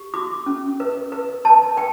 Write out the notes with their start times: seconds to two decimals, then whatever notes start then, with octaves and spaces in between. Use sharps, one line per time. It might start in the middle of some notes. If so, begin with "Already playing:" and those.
Already playing: G4
0.14 F#4 D6
0.46 C#4
0.80 B4
1.12 B4
1.45 B4 A5
1.77 B4 G5